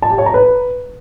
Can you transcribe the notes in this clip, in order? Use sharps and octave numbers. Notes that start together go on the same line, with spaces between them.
A5
G4
C#5
A#5
B4